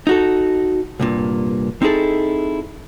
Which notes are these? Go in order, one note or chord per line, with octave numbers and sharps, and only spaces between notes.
D#4 F#4 A4
C2 G2 A#2
C4 D#4 E4 G#4 A4